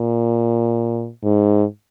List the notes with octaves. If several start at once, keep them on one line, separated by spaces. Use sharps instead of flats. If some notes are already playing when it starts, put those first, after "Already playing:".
Already playing: A#2
G#2